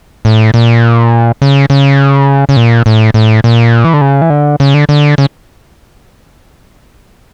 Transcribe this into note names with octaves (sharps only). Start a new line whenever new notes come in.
A2
A#2
C#3
C#3
C#3
A#2
A2
A2
A#2
E3
D3
C#3
E3
D3
C#3
D3
D3
C#3